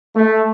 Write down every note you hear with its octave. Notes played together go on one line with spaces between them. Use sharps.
A3